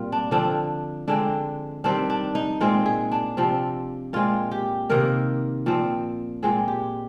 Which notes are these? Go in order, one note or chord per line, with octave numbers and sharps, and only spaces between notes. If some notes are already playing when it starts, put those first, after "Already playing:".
Already playing: A#2 G3 C4 F4
D4
D3 F3 C4 D4
D3 G#3 C4 D4
D#3 G3 C4 D4
D4
D#4
A#2 G#3 C4 F4
G#4
D4
C3 F3 C4
A#2 G#3 C4 F4
G4
C3 D#3 A#3 A#4
A#2 F3 C4
A#2 G#3 C4 G#4
G4